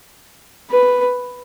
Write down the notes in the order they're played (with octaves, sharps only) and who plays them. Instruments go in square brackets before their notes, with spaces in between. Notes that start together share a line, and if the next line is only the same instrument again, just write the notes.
[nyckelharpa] B4